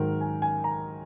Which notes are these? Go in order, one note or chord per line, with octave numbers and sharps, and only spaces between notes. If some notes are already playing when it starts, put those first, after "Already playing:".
Already playing: G#2 D#3 F#3 A#4
G#5
G#5
A#5